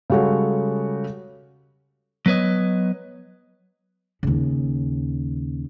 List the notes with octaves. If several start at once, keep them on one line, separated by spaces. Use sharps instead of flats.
C#3 G3 G#3 F#4 A4 C#5
F#3 B3 B4 C#5 D#5
D#2 C#3